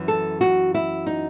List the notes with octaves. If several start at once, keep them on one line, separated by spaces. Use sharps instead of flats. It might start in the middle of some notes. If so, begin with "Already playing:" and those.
Already playing: F#2 E3
A4
F#4
E4
D#4